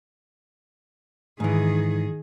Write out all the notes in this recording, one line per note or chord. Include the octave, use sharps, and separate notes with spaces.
G#2 D#3 E3 G#4